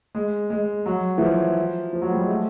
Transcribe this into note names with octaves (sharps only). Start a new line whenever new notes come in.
G#3
G#3
F#3
E3
F3
F3
F#3
G3
G#3
A3